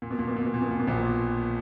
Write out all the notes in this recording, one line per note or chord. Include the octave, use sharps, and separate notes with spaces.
A#2
B2
A#2
B2
A#2
B2
A#2
B2
A#2
B2
A#1 A#2